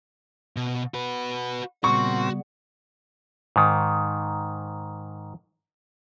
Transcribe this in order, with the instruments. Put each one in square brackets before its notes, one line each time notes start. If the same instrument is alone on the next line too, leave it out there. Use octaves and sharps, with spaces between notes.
[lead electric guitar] B2
F#4 B4
[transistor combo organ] A#2 C4 [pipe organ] C#3 G3 B3 [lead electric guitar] F#4 [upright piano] C#6
[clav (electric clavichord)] G#2 D#3